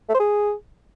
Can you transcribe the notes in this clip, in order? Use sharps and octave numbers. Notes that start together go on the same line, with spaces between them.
A3
C5
G#4